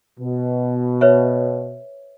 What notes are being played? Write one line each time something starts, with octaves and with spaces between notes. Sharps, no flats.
B2
B4 C#5 E5